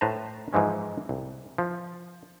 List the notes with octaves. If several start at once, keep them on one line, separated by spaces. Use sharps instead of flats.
A2 B4 C5 A5 A#5
G#2 E3 F3 G#3 C#4
C2
F3